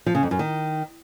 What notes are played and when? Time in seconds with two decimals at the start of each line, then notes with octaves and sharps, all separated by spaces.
0.06 F3
0.15 C#3
0.23 F2
0.31 F#2
0.39 D#3